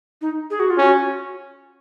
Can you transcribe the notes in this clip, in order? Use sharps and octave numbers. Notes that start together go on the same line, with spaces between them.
D#4
G#4
F#4
F4
C#4 F#4